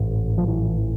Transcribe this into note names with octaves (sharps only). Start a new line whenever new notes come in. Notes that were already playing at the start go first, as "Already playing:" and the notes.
Already playing: A1 G#2
F3
E3